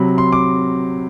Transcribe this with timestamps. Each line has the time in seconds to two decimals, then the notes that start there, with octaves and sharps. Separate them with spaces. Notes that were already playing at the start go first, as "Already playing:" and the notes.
Already playing: C3 F#3 B5
0.18 C6
0.32 D6